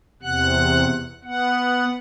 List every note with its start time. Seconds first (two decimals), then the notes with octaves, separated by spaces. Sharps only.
0.23 E2 C3 F#5 F#6
1.24 B3 F#5